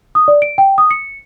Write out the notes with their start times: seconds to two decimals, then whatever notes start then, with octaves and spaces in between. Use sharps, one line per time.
0.15 D#6
0.28 D5
0.42 D7
0.58 G5
0.78 D#6
0.91 C#7